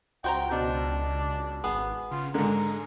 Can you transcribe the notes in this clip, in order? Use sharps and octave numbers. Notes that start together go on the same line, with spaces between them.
C#2 F#4 C5 G5 A#5
B2 D4
G#1 B3 G#4
C#3 F4
G#2 D3 G#3 A#4